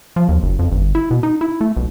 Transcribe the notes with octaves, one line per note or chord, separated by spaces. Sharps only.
F3
D#2
F#1
F2
G1
E4
B2
D#4
E4
A3
B1